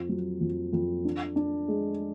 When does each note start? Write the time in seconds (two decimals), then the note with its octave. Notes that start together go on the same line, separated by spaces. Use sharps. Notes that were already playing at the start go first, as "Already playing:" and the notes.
Already playing: F2
0.09 F#3
0.41 F2
0.73 F2
1.05 D4
1.36 D4
1.68 G#3